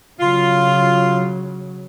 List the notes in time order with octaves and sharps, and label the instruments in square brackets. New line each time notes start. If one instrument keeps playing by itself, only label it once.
[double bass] C#3 F#3 [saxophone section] F4